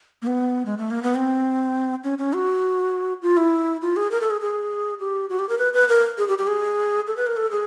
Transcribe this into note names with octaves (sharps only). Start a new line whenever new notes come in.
A#3
B3
G#3
A3
A#3
B3
C4
C#4
C#4
F#4
F4
E4
F4
G#4
A#4
A4
G#4
G#4
G4
F#4
G4
A#4
B4
B4
A#4
G#4
G4
G4
G#4
A4
B4
A#4
A4
G#4